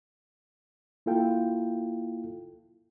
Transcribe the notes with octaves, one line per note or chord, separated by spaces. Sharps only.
A#3 E4 F4 A4 F5 G5